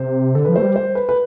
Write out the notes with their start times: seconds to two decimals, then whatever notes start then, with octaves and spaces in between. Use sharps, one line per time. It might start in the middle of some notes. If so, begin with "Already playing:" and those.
Already playing: C3 C5
0.35 D3 A4
0.45 F3 B4
0.56 A3 C5
0.62 G3
0.76 C5
0.95 B4
1.09 B4